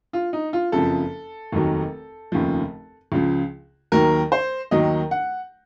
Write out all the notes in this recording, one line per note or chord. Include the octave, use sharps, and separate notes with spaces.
F4
D#4
F4
F#1 F2 C#3 F3 A4
F1 D#2 D#3 F#3
F1 D#2 C#3 F3
C#2 C#3 F3
D#2 D#3 F#3 A#4
C5
D#2 D#3 F#3 D#5
F#5